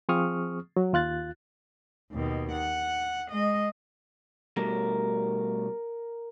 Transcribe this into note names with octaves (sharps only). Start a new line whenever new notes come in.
F3 C4 G#4 C#6 D#6 F6
F#3
D#2 F4 F#6 A6
D#2 B2
F#5
G#3 D#5
B2 G3 A3 A#4